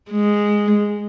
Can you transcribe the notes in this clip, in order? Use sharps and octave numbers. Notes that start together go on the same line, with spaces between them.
G#3